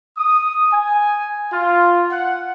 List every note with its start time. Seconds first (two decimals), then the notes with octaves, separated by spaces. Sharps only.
0.17 D#6
0.72 G#5
1.52 F4
2.11 F#5